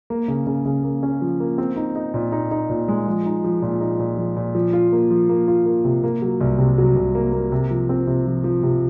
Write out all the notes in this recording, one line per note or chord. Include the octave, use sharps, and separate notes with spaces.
A#3
C#3
C#3
C#3
A#3
C#4
F3
A#3
C4
D#4
D#4
A#2
D#4
D#4
A#2
G#3
F3
D#4
F3
A#2
D#4
A#2
F3
A#2
F3
F4
A#3
F3
A#3
F4
A#3
C3
A#3
F#3
C2
C3
F#3
C2
A#3
A#3
C3
F3
C4
C3
F3
F3
C3